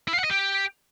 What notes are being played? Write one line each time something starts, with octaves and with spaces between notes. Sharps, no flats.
E4
F5
F#5
D#5
G4